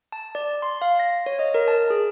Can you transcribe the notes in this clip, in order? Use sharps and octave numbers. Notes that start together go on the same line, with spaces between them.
A5
D5
C6
F5
A#6
C#5
D#5
A#4
A5
G#4